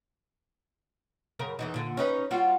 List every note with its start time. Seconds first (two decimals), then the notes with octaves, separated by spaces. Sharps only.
1.39 F#2 C#3 A#4
1.59 E2 E3 D#4
1.74 A#2 D3
1.97 C#4 D#4 B4
2.31 G3 F4 F#4